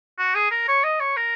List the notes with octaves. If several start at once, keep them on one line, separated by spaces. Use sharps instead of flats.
F#4
G#4
A#4
C#5
D#5
C#5
A#4